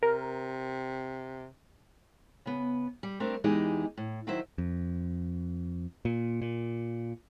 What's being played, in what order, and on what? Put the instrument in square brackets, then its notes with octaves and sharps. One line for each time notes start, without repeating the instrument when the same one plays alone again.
[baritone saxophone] C3 [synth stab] A#4
[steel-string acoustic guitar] C#3 B3
G3
A3 C4 D4 G4 A#4
E2 E3 G#3 D#4 G4 D#5
A2
D#3 F#3 E4 C5 E5
[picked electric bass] F2
A#2
A#2